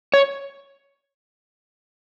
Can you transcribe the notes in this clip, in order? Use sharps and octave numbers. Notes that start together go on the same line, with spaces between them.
C#5